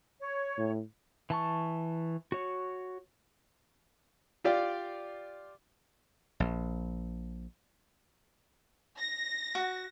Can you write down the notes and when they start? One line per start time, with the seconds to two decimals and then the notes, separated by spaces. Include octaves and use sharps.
0.20 C#5
0.58 A2
1.30 E3 A5 C#6
2.32 F#4 C#5
4.44 F4 G4 D5 F5
6.40 A#1
8.98 A#6
9.55 F#4